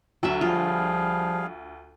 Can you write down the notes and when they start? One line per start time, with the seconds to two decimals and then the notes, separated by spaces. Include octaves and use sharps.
0.23 D2 F#3 F#4 E5
0.41 F3 G3 F4 G#4 F5